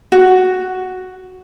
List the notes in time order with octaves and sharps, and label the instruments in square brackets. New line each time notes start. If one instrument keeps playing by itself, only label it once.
[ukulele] F#4